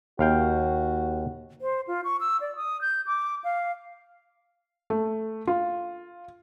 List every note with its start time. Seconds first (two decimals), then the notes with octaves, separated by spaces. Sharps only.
0.19 D#2 F#4 F5 G5
1.61 C5
1.87 F4
2.04 C#6
2.20 E6
2.41 D5
2.56 D#6
2.81 G6
3.06 D6
3.44 F5
4.90 A3
5.47 F4